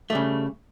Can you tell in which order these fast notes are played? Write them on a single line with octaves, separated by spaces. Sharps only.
A3 G3 C#3